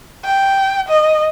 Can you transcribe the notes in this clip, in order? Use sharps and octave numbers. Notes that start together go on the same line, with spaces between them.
G5
D#5